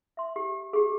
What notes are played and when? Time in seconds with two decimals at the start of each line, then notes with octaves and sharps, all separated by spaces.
0.17 E5 C6
0.36 G4
0.73 G4 G#4